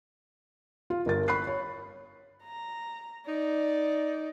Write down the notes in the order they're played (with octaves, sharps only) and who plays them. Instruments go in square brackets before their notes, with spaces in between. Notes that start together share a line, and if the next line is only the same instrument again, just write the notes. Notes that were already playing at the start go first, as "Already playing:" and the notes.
[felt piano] F4
G1 A#4 A6
B5 C#6 F#6 C7
C#5
[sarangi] A#5
[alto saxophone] D#4 [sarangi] D5